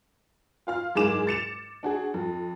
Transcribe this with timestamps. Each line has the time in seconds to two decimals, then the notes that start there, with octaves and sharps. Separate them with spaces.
0.67 F4 F5 F6
0.95 F#1 G#2 G#3 G#4 D6 E7
1.27 A6 C#7 E7 F7
1.83 D4 F#4 G#4
2.14 F2